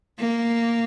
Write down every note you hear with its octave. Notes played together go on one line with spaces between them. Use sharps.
A#3